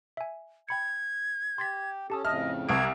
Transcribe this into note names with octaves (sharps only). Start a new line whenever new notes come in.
E5 G#5
G5 B5 G#6 C#7
G4 C6 A6 B6
C#4 G4 A4 A5 D#6
F2 A2 C#3 D#5 E5 A5 D#6 F6
C2 A5 C#6 D#6 G#6 D7